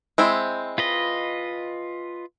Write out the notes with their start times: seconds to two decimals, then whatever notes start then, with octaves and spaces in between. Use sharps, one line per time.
0.18 G#3 C4 E4
0.78 F4 B4 D#5